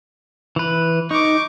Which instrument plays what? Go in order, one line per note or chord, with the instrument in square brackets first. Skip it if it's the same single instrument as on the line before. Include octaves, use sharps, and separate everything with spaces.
[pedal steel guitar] E3 B4
[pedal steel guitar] D#4 [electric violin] C#6 D6